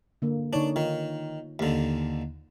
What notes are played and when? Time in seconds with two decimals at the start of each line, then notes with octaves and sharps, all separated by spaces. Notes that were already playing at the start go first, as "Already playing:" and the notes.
0.22 D3 A#3
0.53 D3 D4 D#4 C#5
0.76 D#3 F4
1.59 D#2 D3